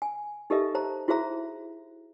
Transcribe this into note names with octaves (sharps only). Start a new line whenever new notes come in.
G#5
D#4 G4 A4 A#4 D#5 E5
C5 A5 A#5
E4 F#4 G#4 C5 E5 A#5